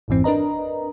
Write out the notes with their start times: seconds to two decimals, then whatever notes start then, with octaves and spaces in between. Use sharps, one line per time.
0.08 G#1 F2 G#2 E3 C4
0.24 D4 A#4 B4 D#5 A#5